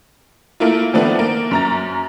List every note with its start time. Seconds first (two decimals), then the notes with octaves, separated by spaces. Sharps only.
0.60 A3 A#3 E4 F4
0.93 D#3 F3 A3 B3 D4 D5
1.19 A#3
1.51 F#2 A#5 A6